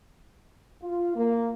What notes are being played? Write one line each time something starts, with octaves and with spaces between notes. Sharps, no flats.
F4
A#3